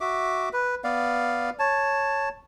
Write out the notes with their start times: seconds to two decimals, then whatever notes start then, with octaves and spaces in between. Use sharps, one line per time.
0.01 F#4 E5 D6
0.53 B4
0.84 B3 D5 F5
1.59 C#5 A5